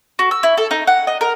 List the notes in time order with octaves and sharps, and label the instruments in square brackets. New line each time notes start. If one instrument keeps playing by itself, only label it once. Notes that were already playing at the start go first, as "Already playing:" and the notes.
[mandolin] F#4
E6
E4
A4
D#4
F#5
D#5
A#4